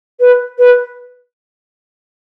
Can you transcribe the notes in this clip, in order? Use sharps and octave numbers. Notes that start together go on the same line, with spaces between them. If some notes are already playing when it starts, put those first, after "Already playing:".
B4
B4